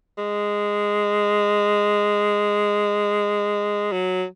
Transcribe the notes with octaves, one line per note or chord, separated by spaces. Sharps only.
G#3
F#3